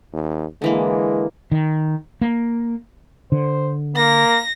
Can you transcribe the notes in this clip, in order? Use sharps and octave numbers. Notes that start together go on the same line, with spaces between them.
D#2
D3 E3 G#3 A#3
D#3
A#3
D3 C5
A#3 A#6